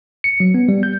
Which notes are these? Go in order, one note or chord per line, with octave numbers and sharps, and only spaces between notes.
C#7
F#3
B3
G3
G6